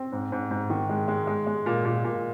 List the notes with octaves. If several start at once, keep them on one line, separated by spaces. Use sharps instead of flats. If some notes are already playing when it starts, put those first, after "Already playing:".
Already playing: C4
G#2
G#2
G#2
D#3
G#3
G#3
G#3
G#3
A#2
A#2
A#2